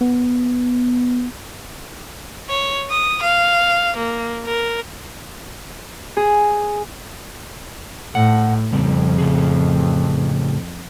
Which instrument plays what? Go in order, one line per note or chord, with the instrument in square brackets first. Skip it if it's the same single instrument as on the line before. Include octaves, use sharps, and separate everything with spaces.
[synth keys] B3
[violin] C#5
D#6
F5
A#3
A#4
[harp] G#4
[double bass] A2 [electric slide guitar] F#5
[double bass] F2 [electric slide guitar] C#3 G3 C4
[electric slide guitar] A2 C#3 G#4